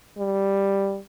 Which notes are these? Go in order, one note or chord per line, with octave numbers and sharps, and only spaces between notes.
G3